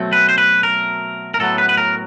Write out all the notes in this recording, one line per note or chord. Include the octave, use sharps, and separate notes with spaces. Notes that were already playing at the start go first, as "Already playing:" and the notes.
Already playing: B2 F#3 A3 C4
B4
C5
B4
A#4
A#4
A2 F#3 B3 A4
B4
B4
A#4